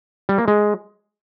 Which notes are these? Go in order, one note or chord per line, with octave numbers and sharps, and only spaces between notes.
G3
A#3
G#3